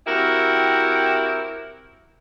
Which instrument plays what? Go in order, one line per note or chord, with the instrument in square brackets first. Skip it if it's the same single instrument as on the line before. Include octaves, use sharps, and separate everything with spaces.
[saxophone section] C4 E4 F#4 G4 A#4